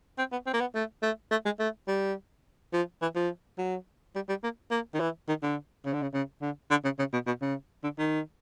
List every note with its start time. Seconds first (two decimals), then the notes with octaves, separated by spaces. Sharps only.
0.18 C4
0.32 B3
0.46 C4
0.53 A#3
0.60 B3
0.75 A3
1.02 A3
1.31 A3
1.45 G#3
1.59 A3
1.88 G3
2.73 F3
3.02 E3
3.15 F3
3.58 F#3
4.15 G3
4.29 G3
4.43 A#3
4.71 A#3
4.94 D#3
5.00 E3
5.28 D#3
5.43 D3
5.85 C#3
5.93 D3
6.02 C#3
6.13 C#3
6.41 D3
6.70 D3
6.84 C#3
6.99 C#3
7.13 B2
7.27 B2
7.41 C#3
7.83 D3
7.98 D#3